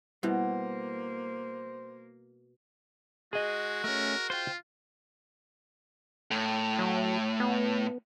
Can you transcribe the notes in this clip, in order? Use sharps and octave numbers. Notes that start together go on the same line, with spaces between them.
B2 G3 A#3 B3 E4 C5
G#3 F#4 G#4 D#5
A3 C#4 A#4
F4 C5 G5
A2
F#3
B3